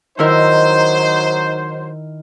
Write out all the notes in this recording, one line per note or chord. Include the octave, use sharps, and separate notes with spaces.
D#3 F#3 D#4 E4 A#4 C5